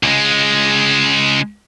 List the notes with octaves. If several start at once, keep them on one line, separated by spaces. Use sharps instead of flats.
C#2 G#3